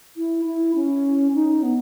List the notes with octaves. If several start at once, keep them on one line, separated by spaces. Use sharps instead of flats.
E4
E4
C#4
D#4
B3